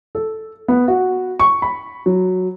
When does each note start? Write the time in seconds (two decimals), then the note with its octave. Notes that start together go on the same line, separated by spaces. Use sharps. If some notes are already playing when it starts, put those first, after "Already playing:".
0.15 A4
0.68 B3
0.88 F#4
1.39 C#6
1.62 B5
2.06 F#3